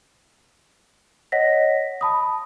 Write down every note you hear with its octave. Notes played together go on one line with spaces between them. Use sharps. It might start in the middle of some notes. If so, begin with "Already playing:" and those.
C#5 D#5 F#5 A#6 B6
A5 B5 D#6